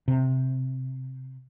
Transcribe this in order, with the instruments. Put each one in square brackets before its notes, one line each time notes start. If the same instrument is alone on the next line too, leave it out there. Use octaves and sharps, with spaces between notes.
[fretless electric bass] C3